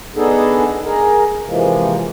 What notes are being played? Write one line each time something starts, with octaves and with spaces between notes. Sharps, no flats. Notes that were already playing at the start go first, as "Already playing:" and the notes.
B3 D4 D#4 G#4 A4
G#4 A#4
C3 E3 F3 G#3 A#3